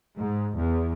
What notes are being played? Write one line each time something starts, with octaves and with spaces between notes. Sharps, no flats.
G#2
E2